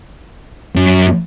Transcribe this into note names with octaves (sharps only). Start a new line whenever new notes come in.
F#2